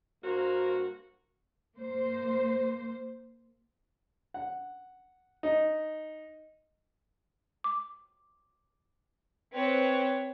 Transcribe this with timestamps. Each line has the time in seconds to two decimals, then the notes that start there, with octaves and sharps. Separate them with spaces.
0.23 G2 A#3 F#4 A#4 C5
1.75 A#3 C5
4.34 F#5
5.43 D#4
7.64 D6
9.53 C4 B4 C#5